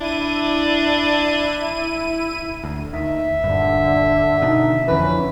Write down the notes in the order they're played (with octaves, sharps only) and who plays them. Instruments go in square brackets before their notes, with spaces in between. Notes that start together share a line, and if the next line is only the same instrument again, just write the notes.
[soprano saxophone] D4 [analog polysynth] E4 D#7
[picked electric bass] D2
[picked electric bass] D#2 D#3 [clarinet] E5
[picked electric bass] D#1 G2 [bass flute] D3
[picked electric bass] B2 D3 D#3 [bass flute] D#4
[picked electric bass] F2 D3 E3 [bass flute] C#4 [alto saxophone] B4